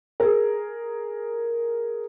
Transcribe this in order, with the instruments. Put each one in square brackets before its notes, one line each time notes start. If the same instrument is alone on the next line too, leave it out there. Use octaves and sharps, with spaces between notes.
[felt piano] G#4 A#4